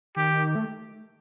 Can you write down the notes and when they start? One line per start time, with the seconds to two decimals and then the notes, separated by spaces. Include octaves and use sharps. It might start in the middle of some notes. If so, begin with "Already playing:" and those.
0.17 D#3 G4
0.55 A3